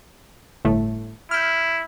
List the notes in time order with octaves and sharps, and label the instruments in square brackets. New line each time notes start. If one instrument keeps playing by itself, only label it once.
[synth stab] G1 A2 A3
[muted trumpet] E4 [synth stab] F6 G6